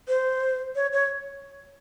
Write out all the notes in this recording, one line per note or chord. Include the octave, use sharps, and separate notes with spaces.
C5
C#5
C#5